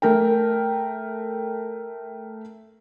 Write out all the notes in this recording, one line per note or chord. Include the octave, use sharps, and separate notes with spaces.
A3 A#4 G5